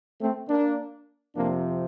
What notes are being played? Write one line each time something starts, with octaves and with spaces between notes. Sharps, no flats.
A3 C4
A#3 D4
F2 C3 F3 A#3 D4